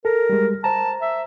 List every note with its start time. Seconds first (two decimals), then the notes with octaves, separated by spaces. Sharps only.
0.05 A4 A#4
0.30 G3 G#3
0.64 C5 A5 A#5
1.02 E5